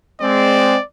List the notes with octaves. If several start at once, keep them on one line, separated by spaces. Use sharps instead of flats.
G#3 C4 D5